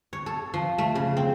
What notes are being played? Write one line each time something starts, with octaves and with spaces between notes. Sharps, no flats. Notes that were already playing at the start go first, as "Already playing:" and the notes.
C#5
A4
F3
A3
C#3
C4